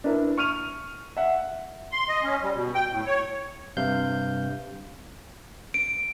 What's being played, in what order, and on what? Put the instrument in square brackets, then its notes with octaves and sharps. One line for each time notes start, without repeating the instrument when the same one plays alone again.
[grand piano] D4 E4 A#4 B4
C#6 F6 D#7 F7
E5 F#5
[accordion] C6
D#5
C#4
G3
B2
G5
A2
C#5
[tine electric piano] G2 C3 F5 G6
[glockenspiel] D7